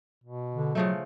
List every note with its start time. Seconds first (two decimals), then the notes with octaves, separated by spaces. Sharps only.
0.24 B2
0.55 D3
0.75 C#3 F3 F#3 A3